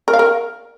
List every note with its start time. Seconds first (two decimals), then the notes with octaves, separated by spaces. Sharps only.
0.08 A#4
0.13 F5
0.19 A#4